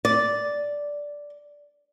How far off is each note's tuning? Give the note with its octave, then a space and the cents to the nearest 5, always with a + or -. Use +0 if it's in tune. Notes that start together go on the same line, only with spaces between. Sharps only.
D5 -5